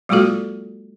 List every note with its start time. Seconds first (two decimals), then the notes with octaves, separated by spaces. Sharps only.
0.09 F#3 G#3 A#3 F4 F#4 A4